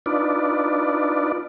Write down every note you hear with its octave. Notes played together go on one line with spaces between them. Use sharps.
D4 D#4 F4 B4 D5